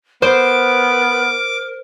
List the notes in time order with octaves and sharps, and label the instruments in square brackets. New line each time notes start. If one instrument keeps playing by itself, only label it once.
[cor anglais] B3 [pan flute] A#4 [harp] C5 [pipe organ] D6